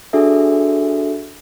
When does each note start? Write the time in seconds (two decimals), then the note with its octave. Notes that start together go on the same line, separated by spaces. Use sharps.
0.13 D4 F#4 G#4 A4 E5